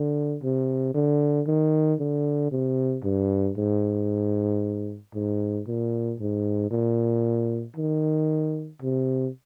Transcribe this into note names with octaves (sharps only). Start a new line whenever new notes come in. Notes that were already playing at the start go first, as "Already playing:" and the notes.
Already playing: D3
C3
D3
D#3
D3
C3
G2
G#2
G#2
A#2
G#2
A#2
D#3
C3